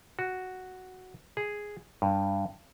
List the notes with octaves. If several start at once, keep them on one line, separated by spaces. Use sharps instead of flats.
F#4
G#4
G2